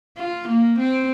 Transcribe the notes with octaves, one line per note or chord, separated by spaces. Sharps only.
F4
A#3
C4